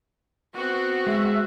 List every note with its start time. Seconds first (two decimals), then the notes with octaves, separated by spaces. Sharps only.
0.54 B3 C4 F#4
1.07 G#3 E5